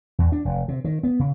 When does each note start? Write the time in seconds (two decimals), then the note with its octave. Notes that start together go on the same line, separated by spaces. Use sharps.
0.19 E2
0.32 D4
0.45 F1
0.68 C3
0.84 D#3
1.03 B3
1.19 C#3